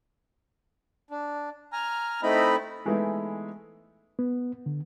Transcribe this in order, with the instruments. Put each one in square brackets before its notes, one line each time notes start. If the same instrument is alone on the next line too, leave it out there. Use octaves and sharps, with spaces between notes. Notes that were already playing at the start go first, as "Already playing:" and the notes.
[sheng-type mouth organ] D4
G#5 A#5 F6
A3 C4 D#4 E4 D#5 B5
[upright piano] E3 G#3 A3 B3 D#4 E4
[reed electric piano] B3
D3